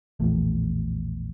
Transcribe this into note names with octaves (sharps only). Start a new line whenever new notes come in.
A#1 E2 A2